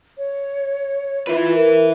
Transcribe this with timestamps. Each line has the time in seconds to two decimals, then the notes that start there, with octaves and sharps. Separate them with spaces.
0.18 C#5
1.27 E4 F4 B4
1.53 A#4